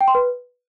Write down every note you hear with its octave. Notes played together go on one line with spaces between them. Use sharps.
G5
C6
B4